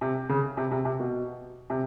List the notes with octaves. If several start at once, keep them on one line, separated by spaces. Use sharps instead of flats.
C3
C#3
C3
C3
C3
B2
C3